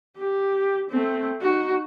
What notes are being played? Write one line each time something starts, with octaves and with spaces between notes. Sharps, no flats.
G4
A3 C4
D#4 F#4